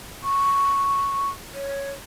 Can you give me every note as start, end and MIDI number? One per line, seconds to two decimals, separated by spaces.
0.23 1.29 85
1.54 1.91 73